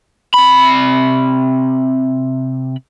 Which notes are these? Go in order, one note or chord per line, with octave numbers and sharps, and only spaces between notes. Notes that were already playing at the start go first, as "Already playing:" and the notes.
C3 B5